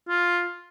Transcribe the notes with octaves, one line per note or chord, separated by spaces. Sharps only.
F4